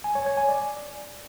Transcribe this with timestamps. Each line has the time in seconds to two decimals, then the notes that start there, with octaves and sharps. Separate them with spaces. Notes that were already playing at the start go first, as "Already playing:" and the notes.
0.04 G#5
0.15 C#5
0.26 C#5
0.37 G#5
0.48 D5